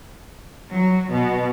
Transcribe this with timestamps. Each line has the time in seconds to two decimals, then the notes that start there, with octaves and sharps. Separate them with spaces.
0.74 F#3
1.11 B2